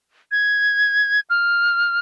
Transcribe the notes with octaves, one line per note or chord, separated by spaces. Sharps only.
G#6
F6